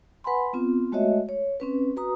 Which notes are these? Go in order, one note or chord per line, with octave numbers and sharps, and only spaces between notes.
B4 F#5 G#5 B5 C6
B3 C4 F4
G#3 A3 F#4 C#5 D#5 E5
C#5
C4 C#4 B4
F#4 B4 A#5 D#6